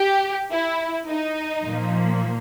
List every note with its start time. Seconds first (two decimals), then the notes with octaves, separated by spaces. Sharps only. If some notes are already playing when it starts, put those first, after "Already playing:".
Already playing: G4
0.51 E4
1.08 D#4
1.67 A#2 F3 A#3